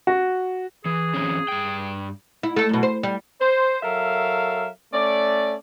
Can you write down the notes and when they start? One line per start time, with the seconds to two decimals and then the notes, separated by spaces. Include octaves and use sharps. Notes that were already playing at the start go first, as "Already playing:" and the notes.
0.07 F#4
0.85 E3 G#4
1.14 E3 C4 C#4
1.48 G2 G5
2.43 E4
2.56 A3 A4
2.69 F#2 B2
2.83 C5
3.03 G3
3.40 C5
3.83 F#3 A4 A#4 E5 F5
4.93 A3 C#4 D5